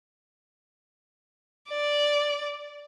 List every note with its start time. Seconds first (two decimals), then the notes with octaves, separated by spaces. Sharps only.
1.70 D5